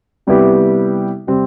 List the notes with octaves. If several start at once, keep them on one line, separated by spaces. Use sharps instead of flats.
C3 G3 B3 E4 G4
C3 G3 C4